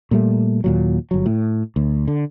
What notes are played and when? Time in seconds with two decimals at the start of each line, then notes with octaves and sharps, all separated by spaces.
0.11 A#2 G3 A3
0.64 D#2 A#2 F#3
1.11 G1 F#3
1.26 A2
1.76 D2
2.07 D3